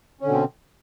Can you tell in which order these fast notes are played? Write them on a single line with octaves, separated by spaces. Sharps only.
C#4 D3 B2 C4